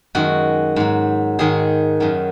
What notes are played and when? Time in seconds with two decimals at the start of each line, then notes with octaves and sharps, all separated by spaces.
0.15 F#2 D#3 G#3 F#4
0.76 G#2 F#3
1.39 G#2 D#3 G#3 G#4
2.00 F#2 D#3 F#3